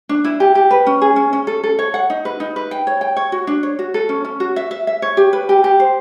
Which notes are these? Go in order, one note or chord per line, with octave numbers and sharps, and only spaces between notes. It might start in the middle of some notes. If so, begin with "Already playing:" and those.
D4
E4
G4
G4
B4
C#4
G#4
C#4
C#4
A4
A4
C#5
F#5
D#4
B4
D#4
B4
G5
C#5
G5
C#5
F#4
D4
C#5
F#4
A4
C#4
C#4
F#4
E5
E5
E5
C#5
G4
B4
G4
G4
C5